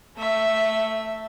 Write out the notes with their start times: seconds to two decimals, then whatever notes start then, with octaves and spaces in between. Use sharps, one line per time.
0.17 A3 E5